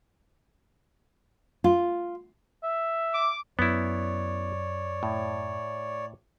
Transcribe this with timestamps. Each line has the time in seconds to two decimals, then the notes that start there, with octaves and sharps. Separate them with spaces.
1.64 F4
2.63 E5
3.12 D6
3.59 F#2 B3 E4 C#5 D5
5.03 A2